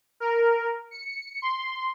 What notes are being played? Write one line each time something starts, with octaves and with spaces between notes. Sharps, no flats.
A#4
C#7
C6